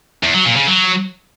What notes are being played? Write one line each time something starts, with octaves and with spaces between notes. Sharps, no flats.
E2
F#3
A#2
C#3
F#3